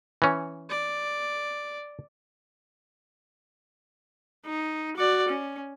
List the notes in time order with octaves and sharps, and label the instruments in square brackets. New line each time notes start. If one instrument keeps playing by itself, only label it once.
[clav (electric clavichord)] E3 C#4
[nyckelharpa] D5
[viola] D#4
F#4 D5
C#4